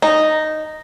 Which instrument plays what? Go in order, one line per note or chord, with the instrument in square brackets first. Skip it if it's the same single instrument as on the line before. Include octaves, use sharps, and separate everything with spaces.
[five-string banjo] D#4